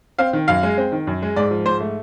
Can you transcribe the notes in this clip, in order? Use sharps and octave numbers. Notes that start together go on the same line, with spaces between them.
C4 F5
D#3
F#2 F5
G#3
C4
D#3
F#2
G#3
G#2 D5
F3
G#2 C5
A3